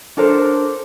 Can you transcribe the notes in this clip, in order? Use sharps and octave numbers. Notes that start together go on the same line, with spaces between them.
D4 A4 A#4 C5